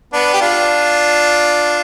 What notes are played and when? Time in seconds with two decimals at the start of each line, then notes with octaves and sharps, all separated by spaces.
0.13 B3 D4
0.34 G4
0.41 D4 F4